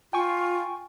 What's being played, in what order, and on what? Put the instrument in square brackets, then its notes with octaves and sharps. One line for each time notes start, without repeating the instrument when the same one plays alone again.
[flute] F4 [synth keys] G5 G#5 C#6